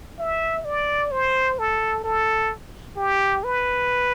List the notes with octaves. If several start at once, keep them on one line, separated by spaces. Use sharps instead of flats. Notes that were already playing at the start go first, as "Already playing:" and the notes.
E5
D5
C5
A4
A4
G4
B4